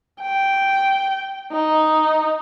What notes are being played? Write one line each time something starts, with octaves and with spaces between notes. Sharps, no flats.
G5
D#4